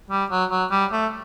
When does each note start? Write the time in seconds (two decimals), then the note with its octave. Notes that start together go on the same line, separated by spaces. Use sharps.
0.10 G3
0.30 F#3
0.50 F#3
0.71 G3
0.92 A3